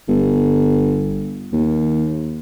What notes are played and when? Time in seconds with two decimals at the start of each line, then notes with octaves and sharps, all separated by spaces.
0.08 G1
1.53 D#2